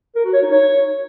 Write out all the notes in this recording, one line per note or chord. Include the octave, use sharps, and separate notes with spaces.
A#4
F#4
C#5
D#4
C#5